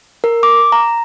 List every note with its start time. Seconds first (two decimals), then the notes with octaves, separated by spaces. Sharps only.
0.24 A#4
0.43 D6
0.72 A#5